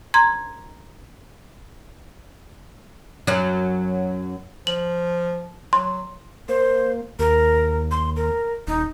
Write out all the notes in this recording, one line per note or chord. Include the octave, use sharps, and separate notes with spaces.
A#5 C6 G#6
F#2 F#3
F3 F#7
F#3 C6
A#3 C5
D#2 A#4
C6
A#4
D#1 D#4